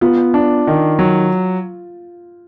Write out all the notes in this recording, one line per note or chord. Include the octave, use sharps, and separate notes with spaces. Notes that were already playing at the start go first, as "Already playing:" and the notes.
B3 F4
D4
D#3
F#3